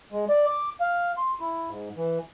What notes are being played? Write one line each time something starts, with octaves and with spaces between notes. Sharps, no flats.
G#3
D5
D6
F5
C6
E4
G#2
E3